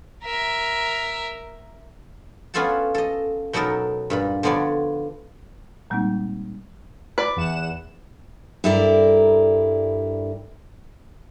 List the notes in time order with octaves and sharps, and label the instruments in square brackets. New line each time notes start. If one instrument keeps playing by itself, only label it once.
[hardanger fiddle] A#4 E5
[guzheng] B3 C#4 F4 A4 F#5 A5
A4 D#5
B2 F#3 B3 D#4 A4 A#4
G2 A#2 B5
D3 F3 B3 C#5 D5
[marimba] A#2 G3 G#3 A#3 C4 D#4
[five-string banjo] B4 D5
[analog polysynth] E2 F#5 E7
[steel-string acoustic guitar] G2 E4 A4 A#4 D5 A#5